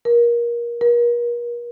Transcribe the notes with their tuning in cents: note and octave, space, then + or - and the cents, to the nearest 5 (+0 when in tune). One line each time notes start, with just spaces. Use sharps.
A#4 +25
A#4 +40